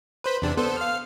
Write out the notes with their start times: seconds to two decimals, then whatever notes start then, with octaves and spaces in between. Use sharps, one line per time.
0.24 B4 C5 B6
0.42 E2 C3 D4
0.57 B3 A4 C5
0.77 F5 F6